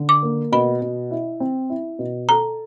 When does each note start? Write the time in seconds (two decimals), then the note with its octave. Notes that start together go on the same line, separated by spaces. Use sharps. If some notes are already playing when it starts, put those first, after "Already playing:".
Already playing: D3
0.09 D6
0.23 A#3
0.52 B2 B5
0.82 B2
1.11 E4
1.40 C4
1.70 E4
1.99 B2
2.28 A4 A#5